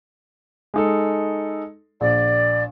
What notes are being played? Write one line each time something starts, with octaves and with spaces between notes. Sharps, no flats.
G#3 D#4 A4
A#1 D5